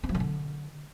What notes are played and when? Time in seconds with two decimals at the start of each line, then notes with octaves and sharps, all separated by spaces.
0.03 C4
0.09 F#3
0.15 D#3
0.20 D3